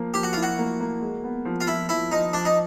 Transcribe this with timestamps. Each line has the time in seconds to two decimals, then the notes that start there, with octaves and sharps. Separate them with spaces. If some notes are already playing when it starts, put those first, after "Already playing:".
Already playing: F3 A#3
0.14 F3 G4
0.23 F#4
0.33 E4 F4
0.43 F#4
0.59 A#3
0.80 A#3
1.01 G#3
1.24 B3
1.45 F3
1.61 F4
1.67 F3 E4
1.89 F3 E4
2.12 F3 D#4
2.33 F3 D4
2.45 D#4